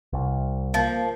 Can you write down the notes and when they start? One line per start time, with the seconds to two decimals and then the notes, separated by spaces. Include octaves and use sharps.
0.13 C2
0.74 F3 A#3